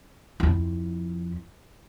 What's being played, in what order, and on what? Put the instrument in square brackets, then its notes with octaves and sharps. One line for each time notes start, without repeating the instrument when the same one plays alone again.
[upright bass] F2 E4